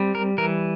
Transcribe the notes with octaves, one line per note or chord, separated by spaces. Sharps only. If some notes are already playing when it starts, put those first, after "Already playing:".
Already playing: G3 C4
A#4
E3 A#4